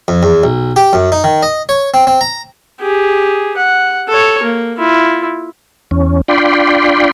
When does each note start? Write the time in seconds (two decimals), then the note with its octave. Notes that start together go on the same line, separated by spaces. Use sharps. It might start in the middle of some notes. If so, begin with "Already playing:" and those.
0.08 F2
0.23 E2
0.44 B1
0.76 G4
0.93 F#2
1.12 D#4
1.24 D#3
1.43 D#5
1.69 C#5
1.94 C4
2.07 C4
2.21 A#5
2.80 G4 G#4
3.57 F#5
4.09 A4 C#5
4.43 A#3
4.78 E4 F4
5.91 E2 C#4
6.28 D4 F4 D5 G5 B5 C6